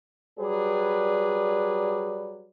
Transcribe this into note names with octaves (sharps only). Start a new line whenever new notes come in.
F#3 G3 G#4 B4 D5